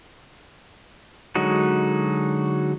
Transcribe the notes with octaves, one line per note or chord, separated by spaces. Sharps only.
D3 F#3 G#3 D#4 F#4